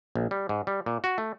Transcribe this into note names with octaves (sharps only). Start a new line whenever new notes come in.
A#1
G3
G#2
G3
A#2
F#4
A3